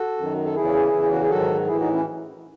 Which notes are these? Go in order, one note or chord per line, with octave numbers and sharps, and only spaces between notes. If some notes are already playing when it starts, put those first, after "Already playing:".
Already playing: F#4 A4
F#2 D#3 F#3
A4
E2 C#3 E3 E4 G#4
E2 C#3 E3
F#4
G#4
G#2 D#3 F#3 F#4 A4
A2 E3 E4 G#4
D#4 F#4
C#4 E4